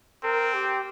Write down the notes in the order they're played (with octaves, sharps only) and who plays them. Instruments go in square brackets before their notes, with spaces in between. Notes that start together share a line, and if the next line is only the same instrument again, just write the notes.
[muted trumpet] C4 [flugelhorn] A#4
[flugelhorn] G4